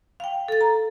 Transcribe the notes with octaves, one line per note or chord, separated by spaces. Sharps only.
F5 G5
A4 A6
A#5